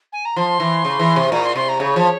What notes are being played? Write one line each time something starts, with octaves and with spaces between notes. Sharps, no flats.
G#5
A#5
F3 C6
E3
C#3
E3
C3
A#2 A#5
C6
C3 C6
A#5
C#3 C#5
F3